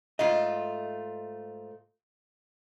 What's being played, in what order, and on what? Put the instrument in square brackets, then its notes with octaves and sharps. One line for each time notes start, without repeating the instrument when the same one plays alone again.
[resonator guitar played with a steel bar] G#2 A3 F4 [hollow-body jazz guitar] D#5